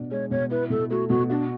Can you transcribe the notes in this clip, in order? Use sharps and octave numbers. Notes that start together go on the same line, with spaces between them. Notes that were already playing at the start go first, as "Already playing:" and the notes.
Already playing: B2 D4
G#3 C#5
B2 C#5
E4 B4
B2 A4
A3 F#4
B2 F#4
D4 F#4